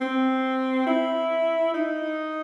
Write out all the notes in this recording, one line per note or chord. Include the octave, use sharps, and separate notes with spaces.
C4
E4
D#4